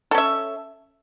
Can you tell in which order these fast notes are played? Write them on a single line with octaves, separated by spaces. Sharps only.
A4 C#4 E5